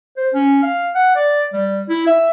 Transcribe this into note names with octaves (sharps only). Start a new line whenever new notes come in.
C5
C#4
F5
F#5
D5
G3
E4
E5